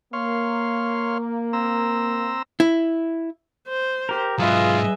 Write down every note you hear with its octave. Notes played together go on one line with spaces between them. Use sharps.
A#3 C#5 F5 C6
C4 A#5 E6
E4
C5
G4 A#4
G#2 F#3 F4 G#4 B4 D#5 E5